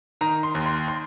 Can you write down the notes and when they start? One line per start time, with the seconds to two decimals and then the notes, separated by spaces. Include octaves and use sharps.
0.21 D#3 A#5
0.43 C6
0.55 D#2
0.66 C6
0.88 C6